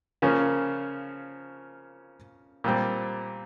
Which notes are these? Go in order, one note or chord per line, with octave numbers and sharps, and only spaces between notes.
C#3 F3 A#3 C#4
A#2 G3 C4